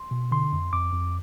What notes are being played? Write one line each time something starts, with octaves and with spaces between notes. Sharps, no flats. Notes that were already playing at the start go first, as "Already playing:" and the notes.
Already playing: C6
B2
D3 C6
F2
F2 D6
F2